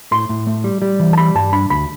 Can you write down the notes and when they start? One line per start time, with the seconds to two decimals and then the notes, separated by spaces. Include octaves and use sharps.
0.11 A2 C6
0.29 A2
0.47 A3
0.64 G3
0.82 G3
1.00 E3
1.13 A5
1.17 G3 B5
1.35 G2 A5
1.53 D4 B5
1.70 D2 B5